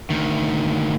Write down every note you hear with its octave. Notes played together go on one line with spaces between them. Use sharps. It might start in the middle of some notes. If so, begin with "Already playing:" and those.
D2 D#3